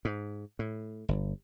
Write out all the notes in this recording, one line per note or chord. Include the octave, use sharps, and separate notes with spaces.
G#2
A2
G1